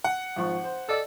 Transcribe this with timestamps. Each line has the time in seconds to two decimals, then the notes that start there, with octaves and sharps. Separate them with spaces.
0.04 F#5
0.36 G#1 F3 C#6
0.64 C5
0.89 A4 D5 D#5 E6